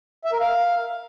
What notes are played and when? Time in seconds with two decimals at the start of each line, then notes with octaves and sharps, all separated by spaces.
0.25 E5
0.33 A#4
0.40 F5